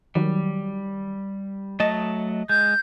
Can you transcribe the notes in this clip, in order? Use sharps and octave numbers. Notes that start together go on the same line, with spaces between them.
D#3 F#3 G3
F#3 A3 D#5 A5
G#3 G6